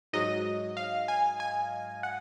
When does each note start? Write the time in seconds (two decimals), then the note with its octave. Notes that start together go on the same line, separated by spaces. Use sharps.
0.13 G#2 F#3 D#5
0.77 F5
1.08 G#5
1.40 G#5
2.03 F#5